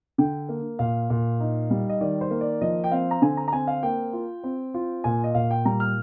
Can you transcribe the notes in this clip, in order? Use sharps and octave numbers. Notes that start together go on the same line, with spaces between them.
D3 G5
A#3
A#2 F5
A#2
D#4
G3
D#5
D#3 D5
C5
A#3
D5
F3 D#5
G5
C4 F5
A#5
D3 G#5
A#5
A#5
C4 G#5
F5
A#3 G5
F4
C4
F4
A#2 G#5
D#5
A#2 F5
G5
G3 A#5
F6